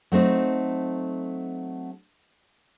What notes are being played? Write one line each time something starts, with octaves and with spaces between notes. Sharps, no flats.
F#3 A3 C4 D#4